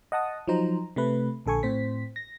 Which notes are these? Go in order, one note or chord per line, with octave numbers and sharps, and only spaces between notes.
D#5 F#5 A5 D#6
F3 F#3 D#4 C5 A#5
C3 A3 B4
A#1 D3 A4 G#5 C#6
A2 C4 C5 B6
A#6